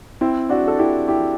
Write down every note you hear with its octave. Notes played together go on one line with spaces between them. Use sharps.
C4 E4
D4 F#4
A4
E4 G4
E4 G4